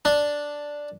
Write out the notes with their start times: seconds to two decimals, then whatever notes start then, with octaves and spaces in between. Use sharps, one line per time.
0.05 D4